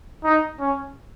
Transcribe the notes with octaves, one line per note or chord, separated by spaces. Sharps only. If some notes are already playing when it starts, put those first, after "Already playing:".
D#4
C#4